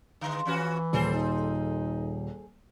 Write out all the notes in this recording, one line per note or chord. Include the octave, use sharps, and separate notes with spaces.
D3 E3 G#3
E3 F3 C#4 F#4
D#1 G#4 A4 C5
D#4